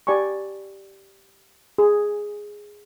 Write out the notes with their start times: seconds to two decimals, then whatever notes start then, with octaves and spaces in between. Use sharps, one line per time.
0.07 G4 D5 G#5 B5 C#6
1.78 G#4